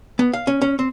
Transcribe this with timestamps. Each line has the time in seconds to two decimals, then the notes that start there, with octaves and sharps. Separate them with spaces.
0.19 B3
0.33 F5
0.47 C#4
0.62 C#4
0.79 C4